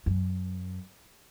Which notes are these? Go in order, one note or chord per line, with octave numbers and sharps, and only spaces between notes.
F#2